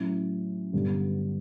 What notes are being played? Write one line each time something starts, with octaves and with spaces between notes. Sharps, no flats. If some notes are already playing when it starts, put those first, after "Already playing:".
Already playing: A2 F#3 C#4 E4
G2 D3 G3 B3 D4